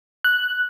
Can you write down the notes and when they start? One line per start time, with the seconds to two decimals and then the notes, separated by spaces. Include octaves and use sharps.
0.24 F#6